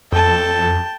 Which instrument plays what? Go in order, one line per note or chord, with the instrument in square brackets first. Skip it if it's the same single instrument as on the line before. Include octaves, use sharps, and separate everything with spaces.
[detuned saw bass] F2 [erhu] A4 [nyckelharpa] G5 A5